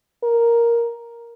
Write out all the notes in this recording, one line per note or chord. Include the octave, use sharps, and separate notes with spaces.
A#4